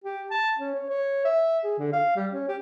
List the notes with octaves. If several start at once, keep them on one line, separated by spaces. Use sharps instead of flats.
G4
A5
C#4
C#5
C#5
E5
G#4
D3
F5
G3
C#4
G4